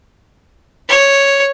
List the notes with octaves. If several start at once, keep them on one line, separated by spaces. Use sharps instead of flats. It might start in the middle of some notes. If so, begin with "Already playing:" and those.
C#5